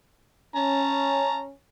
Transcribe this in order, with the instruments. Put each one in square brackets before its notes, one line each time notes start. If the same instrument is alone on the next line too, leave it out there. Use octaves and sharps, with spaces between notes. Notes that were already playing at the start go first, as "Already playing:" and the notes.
[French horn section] C#4 [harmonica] A5 A#5